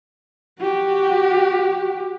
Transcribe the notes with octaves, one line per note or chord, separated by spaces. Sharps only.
F#4 G4